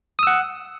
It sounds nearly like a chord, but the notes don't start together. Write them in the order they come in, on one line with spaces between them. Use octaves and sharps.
D#6 E6 F#5